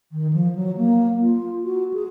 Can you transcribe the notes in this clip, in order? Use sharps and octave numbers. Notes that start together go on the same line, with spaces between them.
D#3
F3
F#3
A#3
F4
F#4
G#4